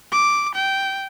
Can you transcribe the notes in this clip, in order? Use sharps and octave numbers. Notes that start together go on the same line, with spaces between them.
D6
G5